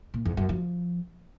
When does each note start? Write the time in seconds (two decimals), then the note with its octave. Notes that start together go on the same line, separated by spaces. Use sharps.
0.14 A#2
0.25 E2
0.37 F#2
0.49 F3